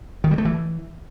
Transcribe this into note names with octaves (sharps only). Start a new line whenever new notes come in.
D#3
G3
A3
E3